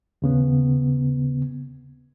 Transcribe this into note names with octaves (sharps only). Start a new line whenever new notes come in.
D#2 C#3 B3